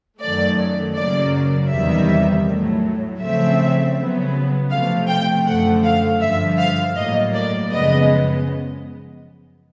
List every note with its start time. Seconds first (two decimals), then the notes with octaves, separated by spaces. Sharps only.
0.21 F#2 D#3 F#3 A3 D5
0.96 F#2 C#3 F#3 A#3 D5
1.70 E2 C3 D#3 G3 E5
2.47 A2 F#3 A3
3.20 C#3 F3 A3 C4 E5
3.96 C#3 F#3 B3
4.71 C3 F3 A3 F5
5.08 G5
5.45 F#2 D3 F3 A3 F#5
5.84 F5
6.21 G2 D3 F3 E5
6.58 F5
6.96 A2 F#3 A#3 D#5
7.33 D5
7.70 F#2 C#3 F3 G#3 B3 D#5